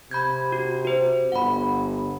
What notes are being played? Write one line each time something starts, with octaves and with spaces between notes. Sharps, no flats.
C3 B5 G6 G#6
F#4
F#4 C5
G1 F#5 B5